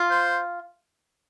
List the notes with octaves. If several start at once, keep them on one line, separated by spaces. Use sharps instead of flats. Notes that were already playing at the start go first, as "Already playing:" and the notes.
Already playing: F4
C5